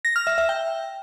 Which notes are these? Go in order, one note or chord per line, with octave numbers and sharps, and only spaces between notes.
A#6
F6
E5
E5
G5